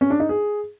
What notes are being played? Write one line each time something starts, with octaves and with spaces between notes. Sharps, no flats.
C#4
D4
D#4
G#4